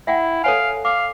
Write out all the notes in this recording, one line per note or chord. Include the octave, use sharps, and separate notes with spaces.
E4 E5 F#5 G5
A4 C#5 F5 G#5
F5 D6